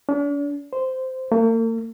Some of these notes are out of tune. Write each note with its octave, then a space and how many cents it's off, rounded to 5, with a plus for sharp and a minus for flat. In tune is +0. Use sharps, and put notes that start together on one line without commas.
D4 -40
C5 -10
A#3 -45